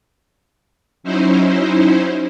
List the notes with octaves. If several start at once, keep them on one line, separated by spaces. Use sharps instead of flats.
F#3 C#4 D#4 E4 C5